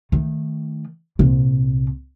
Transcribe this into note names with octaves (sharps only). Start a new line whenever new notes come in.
D#3 A3
C2 A#2